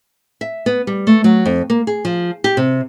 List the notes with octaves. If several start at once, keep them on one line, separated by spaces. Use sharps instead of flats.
E5
B3
G3
A3
F#3
F2
A#3
G#4
F3
G4
C3